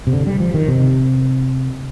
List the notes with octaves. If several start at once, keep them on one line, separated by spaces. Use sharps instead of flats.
C3
D3
G3
F3
D#3
C3